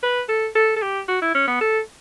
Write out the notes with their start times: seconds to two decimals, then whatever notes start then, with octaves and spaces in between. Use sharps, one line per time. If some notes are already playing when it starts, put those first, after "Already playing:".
0.03 B4
0.28 A4
0.55 A4
0.76 A4
0.82 G4
1.08 F#4
1.22 E4
1.35 C#4
1.47 B3
1.61 A4